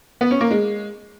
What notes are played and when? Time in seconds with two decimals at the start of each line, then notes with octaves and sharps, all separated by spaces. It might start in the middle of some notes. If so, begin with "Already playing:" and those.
0.21 B3
0.31 C#4
0.41 A#3
0.51 G#3